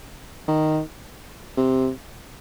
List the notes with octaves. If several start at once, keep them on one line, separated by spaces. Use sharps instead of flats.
D#3
C3